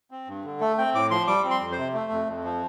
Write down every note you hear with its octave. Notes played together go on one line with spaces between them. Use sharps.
C4
G2
D3
A3 A4
C4 G5
A2 D6
F3 C6
G3 D6
C4
C6
F2
C5
C3
A3
F2
F2
F3